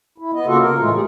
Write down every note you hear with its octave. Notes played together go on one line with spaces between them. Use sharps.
E4
B3 D#5
C#3 A#3 F4 F#4 A4
A#4
A2 E3 G#3 A3 F4
G4 G#4